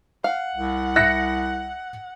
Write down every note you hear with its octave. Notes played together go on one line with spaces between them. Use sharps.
F5 F#5
C2
E4 F#6 A#6 C#7